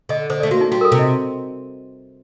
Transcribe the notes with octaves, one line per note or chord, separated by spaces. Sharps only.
D3 D#5
D3 C5
D5
A3
A#3 F#4
D#4
G3 F#4
A#4
A4
C3
D#5